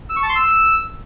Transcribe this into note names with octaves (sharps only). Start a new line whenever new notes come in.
E6
C#6
A5
C6
E6